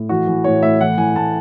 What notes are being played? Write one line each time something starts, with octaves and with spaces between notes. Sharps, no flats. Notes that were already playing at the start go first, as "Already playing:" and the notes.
Already playing: A2
E3 F#4
E3
A2 C#5
A2 E5
E3 F#5
E3 G#5
A2 A5